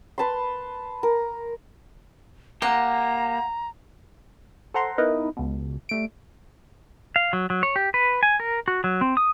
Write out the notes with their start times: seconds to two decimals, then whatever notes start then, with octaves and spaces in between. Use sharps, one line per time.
0.18 B4 A5 B5 C6
1.03 A#4
2.62 A#3 G4 F#5 A#5
4.74 A4 C5 F#5 A#5 C6
4.98 B3 D#4 E4 A#4 B4 D#5
5.37 C#2 B2
5.89 G3 A3 D7
7.16 F5
7.33 F#3
7.50 F#3
7.63 C#5
7.76 G4
7.94 B4
8.23 G#5
8.40 A#4
8.68 F#4
8.84 F#3
9.01 C4
9.17 D#6